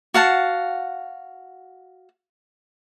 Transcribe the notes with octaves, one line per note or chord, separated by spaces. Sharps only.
F#4 F5 F#5 A5